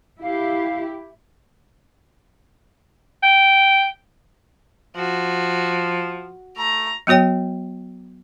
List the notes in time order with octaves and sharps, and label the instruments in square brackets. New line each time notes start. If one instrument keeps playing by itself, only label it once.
[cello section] E4 G4 [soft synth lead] F5
[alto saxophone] G5
[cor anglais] F3 [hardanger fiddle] F#4
[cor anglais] A3 [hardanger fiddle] A#5
[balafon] F#3 B3 F#4 C#5 G5